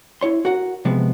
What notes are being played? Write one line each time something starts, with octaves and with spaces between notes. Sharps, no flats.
E4 C#5 C6
F#4 A#4 F#5
C3 F3 G#3 B3